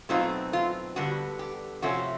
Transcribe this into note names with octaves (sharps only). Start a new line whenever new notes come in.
B2 F#3 A3 C4 D#4 F4
F4
G2 D3 G3 B3 F#4
G4
C3 F3 A3 C#4 F#4